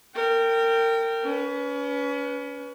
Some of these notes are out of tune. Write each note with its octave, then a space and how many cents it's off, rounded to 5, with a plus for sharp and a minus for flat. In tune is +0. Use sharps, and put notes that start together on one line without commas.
A#4 -30 G5 -5
C#4 +30 B4 +0